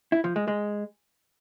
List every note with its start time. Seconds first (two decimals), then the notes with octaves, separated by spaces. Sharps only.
0.12 E4
0.24 F3
0.36 G#3
0.48 G#3